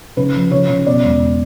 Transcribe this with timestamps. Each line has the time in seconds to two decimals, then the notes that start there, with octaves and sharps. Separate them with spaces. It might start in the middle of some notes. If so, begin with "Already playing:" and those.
0.17 C#3 B4
0.34 F3
0.51 C#3 C#5
0.69 C#3
0.87 B2 D5
1.04 E1